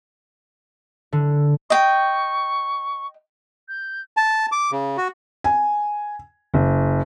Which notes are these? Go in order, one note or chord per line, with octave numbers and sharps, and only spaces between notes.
D3
D#5 G5 C#6
G6
A5
D6
C#3
F#4
G#5
F#1